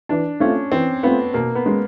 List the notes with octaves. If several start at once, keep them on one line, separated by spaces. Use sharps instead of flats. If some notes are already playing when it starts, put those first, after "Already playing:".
E3 D4
A3 C4 C#4 F4
E3 C4
A3 B3 C4 F4
B2 A#3
B3
G#3 C#4